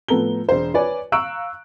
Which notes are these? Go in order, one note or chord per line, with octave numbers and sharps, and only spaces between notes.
A2 F3 B3 A4 A#5 G7
E1 C5
B4 C#5 D5 G#5
F5 A#5 C#6 E6 F#6 D7